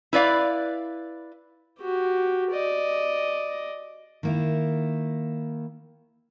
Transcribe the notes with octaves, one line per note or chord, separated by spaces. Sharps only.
E4 B4 D5 F5
F#4 G4
D5 D#5
D#3 A#3 E4